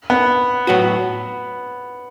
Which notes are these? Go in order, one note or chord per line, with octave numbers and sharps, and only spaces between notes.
B3
A2 F#3 B3 F#4